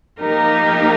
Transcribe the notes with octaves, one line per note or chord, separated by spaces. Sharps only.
F3 A#3 D#4 G4 A#4